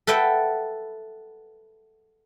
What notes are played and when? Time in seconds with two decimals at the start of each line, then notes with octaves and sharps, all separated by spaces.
0.07 A4 B4 E5 F#5 G5